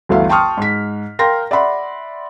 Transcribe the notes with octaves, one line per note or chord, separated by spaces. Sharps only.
G1 D2 E3 E5 F5
G5 A5 C6 C#6 D#6 F6
G#2 B6
A#4 F5 G5 C6 A#6
D5 E5 F#5 B5 C6